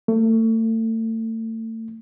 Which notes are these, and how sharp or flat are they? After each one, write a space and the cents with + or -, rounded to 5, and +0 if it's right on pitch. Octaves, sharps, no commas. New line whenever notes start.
A3 +35